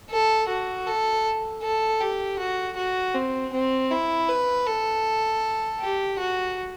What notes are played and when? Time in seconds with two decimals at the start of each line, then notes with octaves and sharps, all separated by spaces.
0.10 A4
0.48 F#4
0.87 A4
1.63 A4
2.01 G4
2.39 F#4
2.76 F#4
3.15 C4
3.53 C4
3.91 E4
4.29 B4
4.67 A4
5.81 G4
6.19 F#4